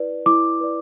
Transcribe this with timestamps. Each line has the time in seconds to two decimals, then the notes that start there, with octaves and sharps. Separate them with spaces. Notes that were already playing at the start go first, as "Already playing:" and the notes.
Already playing: E4 B4 D5
0.26 E4 D6
0.61 B4 D5